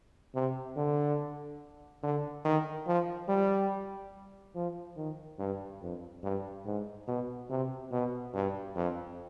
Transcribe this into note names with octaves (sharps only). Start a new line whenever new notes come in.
C3
D3
D3
D#3
F3
G3
F3
D#3
G2
F2
G2
G#2
B2
C3
B2
G2
F2